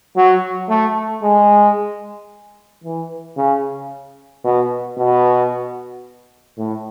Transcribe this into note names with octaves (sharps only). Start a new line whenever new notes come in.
F#3
A3
G#3
E3
C#3
B2
B2
A2